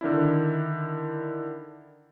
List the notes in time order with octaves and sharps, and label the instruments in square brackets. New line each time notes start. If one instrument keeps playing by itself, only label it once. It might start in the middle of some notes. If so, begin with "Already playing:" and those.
[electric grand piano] D3 D#3 D4 E4